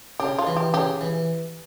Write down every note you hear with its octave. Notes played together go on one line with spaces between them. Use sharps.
C#3 G4
F4
E3
G4
C#3 G4
E3